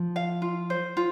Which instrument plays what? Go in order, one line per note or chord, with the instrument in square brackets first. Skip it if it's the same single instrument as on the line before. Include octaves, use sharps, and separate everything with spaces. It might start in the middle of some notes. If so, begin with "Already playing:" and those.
Already playing: [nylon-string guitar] F3
[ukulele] F5
F4
C5
F4